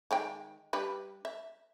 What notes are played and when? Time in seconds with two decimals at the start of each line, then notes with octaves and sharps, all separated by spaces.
0.11 D#3 G#3 G5
0.73 G3 D4 B4
1.25 E5